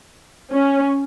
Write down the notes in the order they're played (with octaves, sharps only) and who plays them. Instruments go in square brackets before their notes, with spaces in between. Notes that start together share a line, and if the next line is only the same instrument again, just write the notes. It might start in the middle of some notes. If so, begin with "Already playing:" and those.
[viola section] C#4